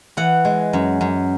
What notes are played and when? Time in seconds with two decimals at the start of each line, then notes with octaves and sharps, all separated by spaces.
0.17 E3 F#5
0.45 G#3
0.73 F#2
1.01 F#2